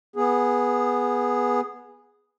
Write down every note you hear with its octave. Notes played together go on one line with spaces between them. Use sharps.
B3 G#4